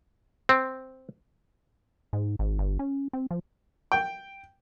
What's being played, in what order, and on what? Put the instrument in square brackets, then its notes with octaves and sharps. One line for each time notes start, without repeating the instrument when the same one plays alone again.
[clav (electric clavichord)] C4
[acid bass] G#2
G#1
G1
C#4
C4
F3
[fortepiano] G5